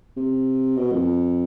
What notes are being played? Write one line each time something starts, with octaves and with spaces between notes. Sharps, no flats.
C3
B2
F2